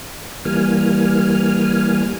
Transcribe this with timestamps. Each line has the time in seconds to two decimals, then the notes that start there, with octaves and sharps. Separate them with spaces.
0.45 E3 G3 A#3 G#5 F6